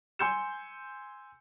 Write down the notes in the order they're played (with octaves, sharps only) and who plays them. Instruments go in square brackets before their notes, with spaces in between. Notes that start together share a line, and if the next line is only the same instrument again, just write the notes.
[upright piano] G#5 C6 E6 G6 C#7 E7